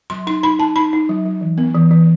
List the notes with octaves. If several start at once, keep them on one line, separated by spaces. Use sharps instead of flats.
F#3 C6
D#4 C6
D#4 B5
D#4 A5
D#4 B5
D#4
F#3
F#3
E3
B3
E3
E3